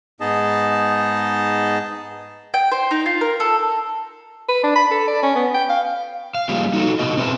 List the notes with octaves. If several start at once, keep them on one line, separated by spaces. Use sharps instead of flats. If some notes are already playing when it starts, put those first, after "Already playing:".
G#2 B3 D#4 G#4 D#5 A5
G5
C5
D#4
F4
A#4
A4
B4
D4
B5
A4
D5
C#4
B3
G5
F5
F5
G3 A#3 F4 G4 G#4
D#4 F#4 G#4 A4
B2 D3 B3 F#4 D#5
C4 G#4 B4 E5